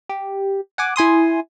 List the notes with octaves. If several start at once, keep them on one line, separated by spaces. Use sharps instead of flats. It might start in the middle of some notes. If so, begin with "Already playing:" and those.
G4
F#5 G#5 D6
E4 G#5 C6 D#6